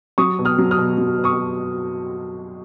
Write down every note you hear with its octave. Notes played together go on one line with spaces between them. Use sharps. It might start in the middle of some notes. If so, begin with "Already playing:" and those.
F#3 C#6 D#6
B2
D#6 F6
F#3
D#6 F6
B2
F#3
B2
C#6 D#6